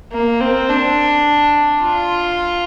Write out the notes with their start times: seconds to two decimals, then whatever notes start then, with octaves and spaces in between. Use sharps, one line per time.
0.12 A#3
0.40 C4
0.69 D4
1.84 F4